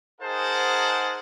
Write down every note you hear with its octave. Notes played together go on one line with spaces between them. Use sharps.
D#4 G#4 A#4 C5 F#5 A5